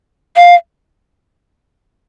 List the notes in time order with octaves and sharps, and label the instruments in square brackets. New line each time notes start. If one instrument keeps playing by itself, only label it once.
[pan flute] F5